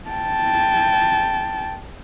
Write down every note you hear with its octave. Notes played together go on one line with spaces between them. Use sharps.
G5 A5